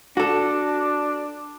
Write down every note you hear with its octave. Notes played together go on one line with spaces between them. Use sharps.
D4 F#4 A4